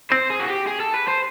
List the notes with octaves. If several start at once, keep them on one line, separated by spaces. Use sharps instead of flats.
C4 C5
G#4
F#4
G4
G#4
A4
B4
C5